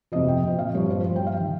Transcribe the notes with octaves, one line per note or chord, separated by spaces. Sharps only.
F2 C3 F3 D#5
G5
A#2 F3
F5
G2 F3 C#5
C5
G2 F3 C5
G5
F5
D#3